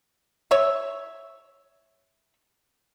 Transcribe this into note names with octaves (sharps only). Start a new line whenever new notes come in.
C#5 E5